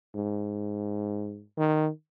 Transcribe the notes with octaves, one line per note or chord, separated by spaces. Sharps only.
G#2
D#3